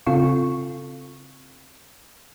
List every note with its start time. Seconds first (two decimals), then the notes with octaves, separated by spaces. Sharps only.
0.06 C#3 C4 F4 A4 F5 C#6